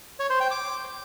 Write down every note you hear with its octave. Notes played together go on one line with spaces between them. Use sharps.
C#5
C5
G5
D6